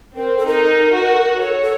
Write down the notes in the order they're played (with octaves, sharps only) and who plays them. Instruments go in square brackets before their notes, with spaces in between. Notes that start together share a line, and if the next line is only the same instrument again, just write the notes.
[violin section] C4 [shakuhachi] A#4
[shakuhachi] A4
[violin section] D#4 [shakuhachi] A#4
[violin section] F#4
[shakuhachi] A4 [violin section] C#5
[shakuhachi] A4